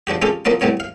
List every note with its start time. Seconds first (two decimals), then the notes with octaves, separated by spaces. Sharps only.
0.07 F3 D4 F#4 G4
0.22 G#3 C#4 F4 G4 A4
0.45 F2 F3 F#3 A#3 D#4 F4
0.61 A2 F#3 G3 B3 C#5
0.80 F5